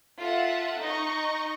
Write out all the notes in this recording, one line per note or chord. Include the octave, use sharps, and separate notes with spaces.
F4 A4 E5 F#5
D#4 D#5 C#6